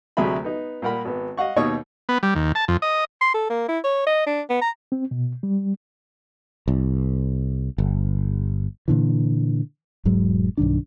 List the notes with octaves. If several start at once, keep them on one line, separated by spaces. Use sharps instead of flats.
D2 C3 F#3 G#4 E5 B5
B3 D#4
A#2 G3 A#4 F#5 B5
G#1 B3
D#5 F5 F#5 C#6
D#2 B2 D#4 C#5 C#6 D#6
B3
G3
D#2
A5
F2
D#5
C6
A4
A#3
E4
C#5
D#5
D4
B3
A#5
C4
B2
G3
C2
G1
A#2 D3 E3
E1 G#2 F#3 G#3
B1 G2 D#3 D4